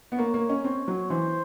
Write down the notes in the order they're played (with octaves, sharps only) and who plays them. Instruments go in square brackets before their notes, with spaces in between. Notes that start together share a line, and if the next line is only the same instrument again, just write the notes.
[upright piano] B3
[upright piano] A#3 [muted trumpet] C#5
[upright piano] A#3
C#4
C4
F#3
[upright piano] E3 [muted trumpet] C5